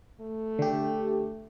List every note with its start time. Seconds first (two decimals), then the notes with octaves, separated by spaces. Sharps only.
0.21 A3
0.59 D3 G4